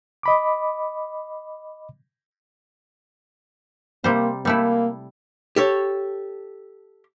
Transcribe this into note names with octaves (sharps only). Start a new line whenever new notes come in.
D#5 B5 D6
C3 G3 A#3 C5
G3 A3 A#3 E4
G4 A4 C#5